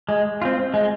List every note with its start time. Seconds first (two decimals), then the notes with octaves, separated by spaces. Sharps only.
0.09 G#3
0.42 C4 F4
0.74 G#3